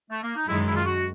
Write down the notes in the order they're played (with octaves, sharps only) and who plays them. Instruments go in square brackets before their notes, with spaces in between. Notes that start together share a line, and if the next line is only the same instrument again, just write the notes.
[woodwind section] A3
A#3
D#4
[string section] F#2 D#3 G#3 [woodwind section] E4
[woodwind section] E4
F4
F#4